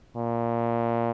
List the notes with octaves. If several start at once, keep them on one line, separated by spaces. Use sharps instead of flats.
A#2